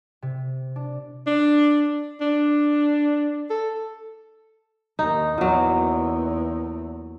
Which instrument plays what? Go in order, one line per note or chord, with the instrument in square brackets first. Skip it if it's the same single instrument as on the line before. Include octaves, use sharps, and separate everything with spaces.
[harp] C3
D4
[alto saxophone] D4
D4
A4
[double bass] D#2 [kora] D#4
[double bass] E2 [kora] A#2 F#3